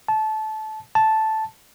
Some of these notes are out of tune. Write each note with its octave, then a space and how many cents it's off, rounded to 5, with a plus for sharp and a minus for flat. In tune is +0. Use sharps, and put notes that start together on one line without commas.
A5 -20
A5 -5